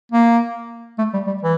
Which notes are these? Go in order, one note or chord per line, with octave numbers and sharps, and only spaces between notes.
A#3
A3
G3
G3
E3